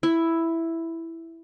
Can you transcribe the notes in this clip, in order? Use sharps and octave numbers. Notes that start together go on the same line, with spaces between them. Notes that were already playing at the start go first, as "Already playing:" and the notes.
E4